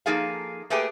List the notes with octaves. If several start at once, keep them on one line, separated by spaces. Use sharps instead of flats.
F3 A#3 D#4 G#4 A4 F5
A3 A#3 G4 G#4 B4 G5